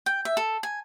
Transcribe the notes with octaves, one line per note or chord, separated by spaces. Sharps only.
G5
E5
A4
G#5